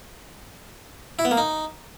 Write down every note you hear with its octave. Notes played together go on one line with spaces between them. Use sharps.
E4
B3
A#3
D#4